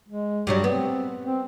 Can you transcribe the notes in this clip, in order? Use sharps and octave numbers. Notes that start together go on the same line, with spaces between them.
G#3
G2 F#3 G3
B3 C4
C4